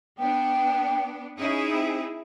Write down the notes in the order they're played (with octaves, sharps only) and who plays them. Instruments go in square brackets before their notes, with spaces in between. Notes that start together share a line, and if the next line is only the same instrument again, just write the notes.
[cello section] B3 D4 [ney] G5
[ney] C#4 [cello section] D#4 E4 G#4
[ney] C4